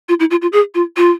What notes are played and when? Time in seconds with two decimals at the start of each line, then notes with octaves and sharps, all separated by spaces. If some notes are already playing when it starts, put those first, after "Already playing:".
0.09 F4
0.20 E4
0.31 F4
0.42 F4
0.52 G#4
0.75 F4
0.97 F4